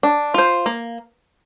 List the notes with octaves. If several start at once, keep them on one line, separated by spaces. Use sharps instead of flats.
D4
F4 C5
A#3